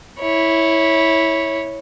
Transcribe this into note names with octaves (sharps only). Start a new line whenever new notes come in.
E4 C#5